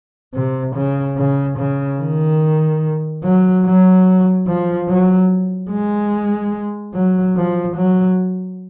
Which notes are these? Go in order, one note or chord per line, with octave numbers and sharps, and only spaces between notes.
C3
C#3
C#3
C#3
D#3
F#3
F#3
F3
F#3
G#3
F#3
F3
F#3